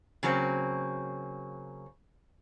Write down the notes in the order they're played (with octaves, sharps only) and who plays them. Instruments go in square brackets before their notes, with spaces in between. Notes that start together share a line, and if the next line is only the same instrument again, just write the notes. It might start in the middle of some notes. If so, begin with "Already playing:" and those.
[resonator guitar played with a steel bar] C#3 F#3 A#3 C4